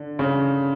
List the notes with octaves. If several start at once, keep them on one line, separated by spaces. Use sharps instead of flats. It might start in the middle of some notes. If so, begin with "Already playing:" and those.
Already playing: D3
C#3